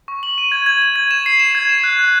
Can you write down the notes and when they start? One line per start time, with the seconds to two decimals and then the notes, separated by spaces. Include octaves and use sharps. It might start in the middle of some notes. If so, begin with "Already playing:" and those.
0.08 C#6
0.23 F#7
0.38 D#7
0.52 G#6
0.66 G#6
0.82 G#6
0.96 G#6
1.11 E7
1.26 C7
1.40 E7
1.55 G#6
1.69 E7
1.84 F#6
1.99 F#6